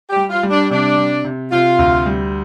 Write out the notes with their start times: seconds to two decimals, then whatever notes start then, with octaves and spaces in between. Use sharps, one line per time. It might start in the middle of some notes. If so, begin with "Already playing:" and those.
0.09 G4
0.16 G3
0.30 F4
0.43 G3
0.50 D4
0.70 C3 D4
0.97 C3
1.24 C3
1.52 C3 F4
1.79 D2
2.06 G3